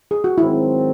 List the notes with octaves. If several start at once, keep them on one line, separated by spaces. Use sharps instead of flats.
G#4
F#4
G#2 D#3 F#3 C4 E4